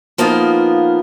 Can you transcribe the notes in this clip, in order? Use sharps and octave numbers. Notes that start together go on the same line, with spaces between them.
F3 A#3 B3 D#4 F4